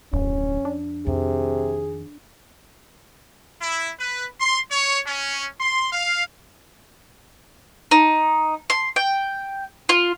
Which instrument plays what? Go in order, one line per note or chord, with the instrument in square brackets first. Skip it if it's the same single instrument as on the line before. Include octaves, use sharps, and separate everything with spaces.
[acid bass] D1 [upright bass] F2 [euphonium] C#4
[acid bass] D4
[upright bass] F2 D#3 [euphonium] C3 [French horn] G#4
[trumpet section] E4
B4
C6
C#5
C#4
C6
F5
[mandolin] D#4
C6
G5
F4